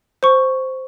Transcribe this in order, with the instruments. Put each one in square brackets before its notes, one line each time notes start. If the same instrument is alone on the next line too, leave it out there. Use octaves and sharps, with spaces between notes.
[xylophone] C5 C#6